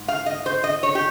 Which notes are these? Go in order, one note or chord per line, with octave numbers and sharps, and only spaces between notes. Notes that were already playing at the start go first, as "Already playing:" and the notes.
Already playing: G#2
F5
D#5
C5
D#5
C#5
G4